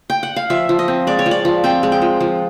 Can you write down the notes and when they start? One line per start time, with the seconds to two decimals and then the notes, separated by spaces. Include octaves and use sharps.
0.10 G5
0.23 F#5
0.36 F5
0.50 F3 E5
0.69 F3
0.79 D#5
0.88 C4
1.07 G#3 D5
1.19 C#5
1.26 F3
1.31 D5
1.45 F3
1.64 C4 G5
1.83 G#3
1.92 G5
2.02 F3
2.20 F3